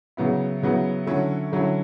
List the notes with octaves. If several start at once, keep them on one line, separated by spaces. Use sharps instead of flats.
C#3 F#3 B3 E4
C#3 F#3 B3 E4
D3 F#3 C#4 E4
D3 F#3 C#4 E4